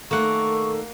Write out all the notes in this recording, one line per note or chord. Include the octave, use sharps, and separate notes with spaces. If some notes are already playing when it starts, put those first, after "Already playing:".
D#3 A3 A#3 A4 F#5 C#6